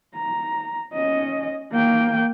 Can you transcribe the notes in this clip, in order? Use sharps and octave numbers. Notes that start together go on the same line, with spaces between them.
A#5
C#4 D#5
A#3 G5